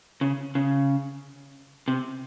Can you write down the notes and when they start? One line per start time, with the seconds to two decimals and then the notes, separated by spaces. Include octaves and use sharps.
0.21 C#3
0.55 C#3
1.88 C3